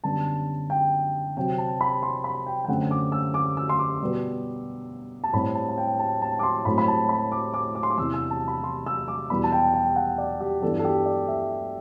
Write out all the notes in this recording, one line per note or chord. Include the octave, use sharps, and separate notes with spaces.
F#2 D3 G3 B3 A5
G5
C3 F#3 C4 G5
A5
B5
C6
B5
G5
G5
F#2 D3 A3 C4 F#5
D6
E6
D6
E6
C6
D6
B2 G3 B3
A5
A2 G3 C4 B5
A5
A5
G5
A5
A5
D6
C6
A2 F#3 A3 C4 B5
B5
A5
B5
D6
D6
D6
C6
D6
E2 C3 E3 E6
E6
A5
B5
C6
E6
D6
E2 B2 G3 B3 B5
A5
G5
G5
F#5
D5
G4
G2 E3 G3 B3 A4
A4
G4
D5
E5